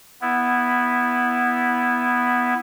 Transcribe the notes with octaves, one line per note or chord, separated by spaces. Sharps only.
B3 E4